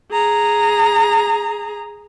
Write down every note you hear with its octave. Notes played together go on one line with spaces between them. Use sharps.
G#4 A#5